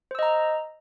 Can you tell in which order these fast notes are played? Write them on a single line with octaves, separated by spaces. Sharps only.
C5 E6 D#5 A#5